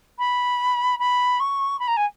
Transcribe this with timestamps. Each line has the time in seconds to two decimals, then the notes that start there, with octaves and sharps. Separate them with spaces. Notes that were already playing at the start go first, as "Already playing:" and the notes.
0.18 B5
0.99 B5
1.40 C#6
1.79 B5
1.87 A#5
1.96 G#5